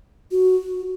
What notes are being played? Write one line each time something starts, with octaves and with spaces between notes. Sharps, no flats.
F#4